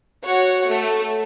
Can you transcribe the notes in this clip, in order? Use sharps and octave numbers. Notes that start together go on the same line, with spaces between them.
F#4 C#5 F#5
A3